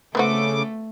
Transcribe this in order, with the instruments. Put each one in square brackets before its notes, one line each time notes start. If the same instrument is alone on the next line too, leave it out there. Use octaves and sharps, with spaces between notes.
[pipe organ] C#3 D6 [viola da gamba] A3 [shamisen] B3 C4 F#4 [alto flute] A4